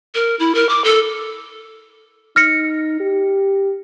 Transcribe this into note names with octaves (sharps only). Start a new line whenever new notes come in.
A#4
E4
A#4
D6
A4
D#4 F6 A#6 C#7
G4